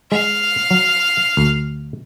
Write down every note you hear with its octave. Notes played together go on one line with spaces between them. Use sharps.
G#3 F5
F#3
D2